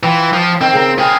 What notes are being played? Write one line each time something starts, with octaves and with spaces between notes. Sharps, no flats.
E3 C4 F4
F3
D#3 C4
C#3 A#4
C4 F4 G#4 F5